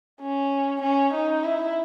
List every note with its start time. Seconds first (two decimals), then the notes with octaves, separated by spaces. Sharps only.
0.22 C#4
0.83 C#4
1.14 D#4
1.44 E4